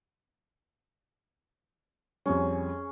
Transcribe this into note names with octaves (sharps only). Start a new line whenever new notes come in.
F2 G3 C#4 G#4